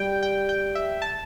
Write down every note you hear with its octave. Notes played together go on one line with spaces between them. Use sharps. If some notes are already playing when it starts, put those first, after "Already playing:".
Already playing: G3 G5
G5
G5
E5
A5